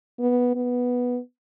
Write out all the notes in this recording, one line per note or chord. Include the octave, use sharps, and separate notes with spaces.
B3
B3